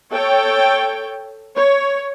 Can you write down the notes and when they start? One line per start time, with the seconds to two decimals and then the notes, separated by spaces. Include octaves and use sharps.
0.11 A4 C#5 G5
1.55 C#5